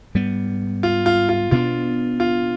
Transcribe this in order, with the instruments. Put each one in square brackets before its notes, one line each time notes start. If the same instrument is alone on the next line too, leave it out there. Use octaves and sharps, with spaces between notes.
[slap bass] G#2 G3 B3
[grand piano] F4
F4
F4
[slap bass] B2 B3 D4 [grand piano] F4
[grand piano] F4